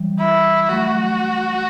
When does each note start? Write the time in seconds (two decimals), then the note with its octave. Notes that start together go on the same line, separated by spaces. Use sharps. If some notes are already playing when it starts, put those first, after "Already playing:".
Already playing: E3 G3
0.18 E4
0.69 F#3 A3 F#4